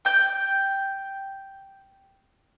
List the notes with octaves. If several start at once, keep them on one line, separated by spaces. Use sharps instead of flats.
G5 G6